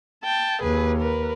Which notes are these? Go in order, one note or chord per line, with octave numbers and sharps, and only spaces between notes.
G5 A5
D#2 G#4 B4
A#4 B4